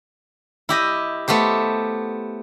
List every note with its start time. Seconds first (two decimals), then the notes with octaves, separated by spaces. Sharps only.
0.69 E4 G4 D#5
1.28 A3 B3 G4 C5